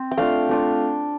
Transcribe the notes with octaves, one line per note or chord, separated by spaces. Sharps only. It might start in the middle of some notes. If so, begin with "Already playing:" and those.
Already playing: C4
G5
A3 D4 F4 F5
A3 D4 F4